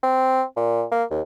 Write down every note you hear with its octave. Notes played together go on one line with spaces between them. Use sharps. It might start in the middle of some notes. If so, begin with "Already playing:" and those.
C4
A#2
A#3
D#2